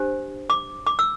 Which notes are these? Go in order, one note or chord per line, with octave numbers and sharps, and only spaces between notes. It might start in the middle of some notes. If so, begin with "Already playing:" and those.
Already playing: D4 G4 C5
D6
D6
E6